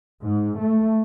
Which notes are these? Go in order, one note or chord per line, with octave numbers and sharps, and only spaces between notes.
G#2
A3